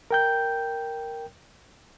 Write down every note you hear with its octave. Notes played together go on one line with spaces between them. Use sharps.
A#4 G5 G6